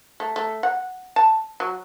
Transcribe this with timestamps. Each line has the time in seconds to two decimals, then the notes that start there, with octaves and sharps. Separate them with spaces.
0.20 A3
0.36 A3
0.63 F#5
1.16 A5
1.60 F#3